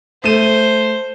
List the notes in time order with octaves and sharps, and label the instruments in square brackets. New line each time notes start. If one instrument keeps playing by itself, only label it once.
[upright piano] A3 D#7 [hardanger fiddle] C5